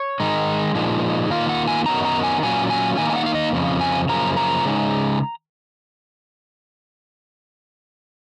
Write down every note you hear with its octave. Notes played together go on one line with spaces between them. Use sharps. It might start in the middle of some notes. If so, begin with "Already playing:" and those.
Already playing: C#5
D#3 G#3 D#4
A#2 F3 G#3 D#4
D#3 A#3 F4 F5
F#5
G#5
F#2 D#3 F#3 B3 D#4 A#5
A#5
G#5
A#2 F#3 C#4 F4 G#5
G#5
D#3 A#3 D#4 G#5
G#5
F#5
F5
D#5
F2 C#3 F3
G#5
F#2 C#3 F3 A#3 A#5
A#5
C#3 G#3 D#4